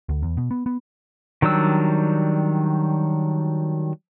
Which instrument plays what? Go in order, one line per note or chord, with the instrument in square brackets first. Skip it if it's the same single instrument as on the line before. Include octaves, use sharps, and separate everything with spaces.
[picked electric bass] D2
E2
B2
B3
B3
[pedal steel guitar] D#3 F#3 G3 D4 E6